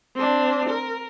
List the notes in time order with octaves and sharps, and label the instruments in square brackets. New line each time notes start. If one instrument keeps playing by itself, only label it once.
[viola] C4 D4
A#4